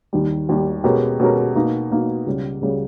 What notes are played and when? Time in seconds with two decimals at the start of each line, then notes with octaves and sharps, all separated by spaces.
0.13 D#2 D#3 G3
0.49 D#2 D#3 G3
0.84 B2 G#3 C#4 G4 A#4
1.20 B2 G#3 C#4 G4 A#4
1.55 B2 A#3 D#4
1.91 B2 A#3 D#4
2.26 C#2 C#3 G3
2.61 C#2 C#3 G3